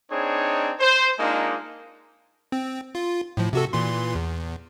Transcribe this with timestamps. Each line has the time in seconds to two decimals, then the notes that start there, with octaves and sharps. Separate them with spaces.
0.10 C4 D4 D#4 G#4 C#5
0.80 C5
1.19 G#3 A#3 D4 D#4 F4
2.52 C4
2.95 F4
3.37 A2 F3
3.53 C3 F#4 A4
3.73 A#2 E3 C6
4.15 E2